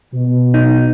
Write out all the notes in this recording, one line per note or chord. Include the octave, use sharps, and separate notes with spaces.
B2
D#4